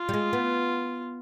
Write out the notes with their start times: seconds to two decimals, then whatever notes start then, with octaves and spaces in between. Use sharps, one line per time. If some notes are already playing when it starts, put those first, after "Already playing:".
Already playing: F4
0.09 G3
0.14 G#3
0.33 B3